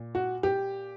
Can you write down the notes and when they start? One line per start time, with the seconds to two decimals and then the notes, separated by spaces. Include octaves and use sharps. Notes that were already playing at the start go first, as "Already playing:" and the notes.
Already playing: A#2
0.15 F#4
0.43 G4